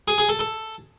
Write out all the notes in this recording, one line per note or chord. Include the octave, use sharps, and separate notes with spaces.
G#4
G#4
A4
A4